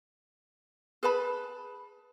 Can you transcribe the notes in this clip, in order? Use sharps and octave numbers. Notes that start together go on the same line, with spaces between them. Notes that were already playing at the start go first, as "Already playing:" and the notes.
G#4 B4 A5 B5